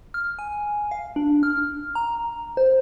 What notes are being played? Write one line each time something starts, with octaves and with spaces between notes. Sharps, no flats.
F6
G#5
F5
D4
F6
A#5
C5